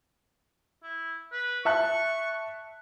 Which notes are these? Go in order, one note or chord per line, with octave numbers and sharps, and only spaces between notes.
E4
B4
E5 A5 C#6 F#6